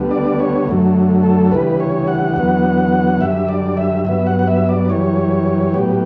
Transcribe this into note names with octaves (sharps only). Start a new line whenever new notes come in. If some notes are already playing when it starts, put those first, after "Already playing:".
Already playing: D2 D3 G3 B3
D5
C#5
F#2 D3 F#3 A3
A4
D2 C#3 E3 G3 B4
C#5
F#5
E2 D3 F#3 B3
F#2 D3 G3 E5
D5
E5
G2 F#3 B3 E5
F#5
F#5
E5
D5
F#2 E3 G3 C#5
A2 F#3 B3 G4